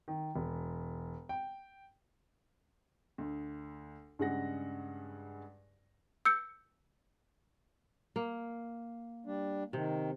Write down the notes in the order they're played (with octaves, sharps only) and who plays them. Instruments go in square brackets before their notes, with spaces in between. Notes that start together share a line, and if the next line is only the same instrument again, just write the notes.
[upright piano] D#3
E1
G5
[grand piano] D2
G2 C#3 G#3 F#5 A#6
[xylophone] E6 G6 C#7
[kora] A#3
[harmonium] G3 D4
[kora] C3 [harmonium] D#3